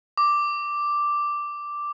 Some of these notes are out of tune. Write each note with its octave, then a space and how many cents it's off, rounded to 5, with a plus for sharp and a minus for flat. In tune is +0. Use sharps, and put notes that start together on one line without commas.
D6 +0